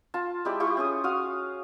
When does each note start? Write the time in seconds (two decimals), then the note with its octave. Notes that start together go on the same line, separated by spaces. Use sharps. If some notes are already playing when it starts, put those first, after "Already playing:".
0.14 F4 A5
0.45 G#3 E4 G4 D5
0.60 E4 F4 G4 C#6
0.77 C#4 G#4 D#6
1.04 F#4 F5 D#6